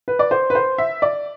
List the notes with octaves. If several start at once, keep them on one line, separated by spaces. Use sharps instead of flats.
B4
D5
C5
B4
C5
E5
D5